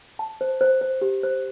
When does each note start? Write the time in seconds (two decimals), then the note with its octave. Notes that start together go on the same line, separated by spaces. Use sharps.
0.19 A5
0.41 C5
0.61 C5
0.81 C5
1.02 G4
1.23 C5